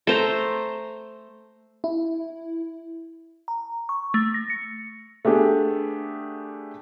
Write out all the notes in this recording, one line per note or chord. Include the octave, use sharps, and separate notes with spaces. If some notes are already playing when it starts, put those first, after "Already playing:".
A3 C5 A#5
E4
A#5
C#6
A3
A#6
C#7
A3 B3 D4 G4 G#4